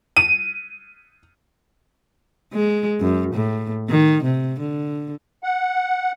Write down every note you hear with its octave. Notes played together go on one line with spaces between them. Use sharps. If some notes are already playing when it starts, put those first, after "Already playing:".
D#7
G#3
F#2
A2
D#3
C3
D3
F#5